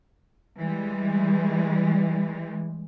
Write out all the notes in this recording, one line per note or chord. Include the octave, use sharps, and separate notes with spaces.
E3 G3 G#3